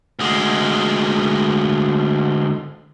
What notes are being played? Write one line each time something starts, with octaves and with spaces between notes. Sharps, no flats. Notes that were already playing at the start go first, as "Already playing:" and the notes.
D2 G#3